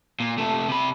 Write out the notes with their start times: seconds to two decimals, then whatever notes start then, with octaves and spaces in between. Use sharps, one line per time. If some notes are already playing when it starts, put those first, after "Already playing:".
0.20 A#2
0.38 C3 A3
0.68 C3 B5